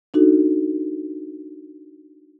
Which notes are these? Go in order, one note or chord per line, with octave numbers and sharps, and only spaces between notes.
D4 D#4 F#4 A4